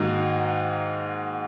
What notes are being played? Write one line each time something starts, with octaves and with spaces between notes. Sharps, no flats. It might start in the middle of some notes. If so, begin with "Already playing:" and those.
Already playing: G#2 D#3 A#3 D#4 F#4